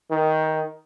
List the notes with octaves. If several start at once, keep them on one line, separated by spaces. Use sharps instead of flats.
D#3